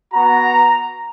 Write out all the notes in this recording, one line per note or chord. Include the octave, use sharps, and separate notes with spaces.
B3 F#4 A#5